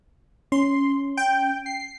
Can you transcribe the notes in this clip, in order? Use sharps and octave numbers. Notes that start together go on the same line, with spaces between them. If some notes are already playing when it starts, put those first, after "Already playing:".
C#4 C6
G5
C7